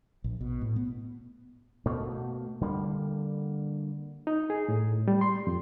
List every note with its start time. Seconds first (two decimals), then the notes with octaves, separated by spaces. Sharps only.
0.24 A#1
0.41 B2
0.61 A2
0.76 B3
1.86 B2 A3 A#3
2.61 D3 G3 A#3
4.27 D#4
4.50 G#4
4.69 A2
5.08 G3
5.21 C6
5.47 F2